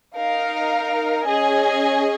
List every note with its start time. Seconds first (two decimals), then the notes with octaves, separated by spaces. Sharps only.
0.15 D#4 A#4 F5
1.25 C#4 G#4 D#5 G#5